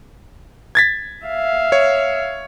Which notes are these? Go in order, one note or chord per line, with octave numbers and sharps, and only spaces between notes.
G#6 A6 B6
E5 F5
C#5